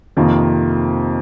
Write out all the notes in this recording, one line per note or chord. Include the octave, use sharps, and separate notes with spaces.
F2 C3 D#3 A#3 F4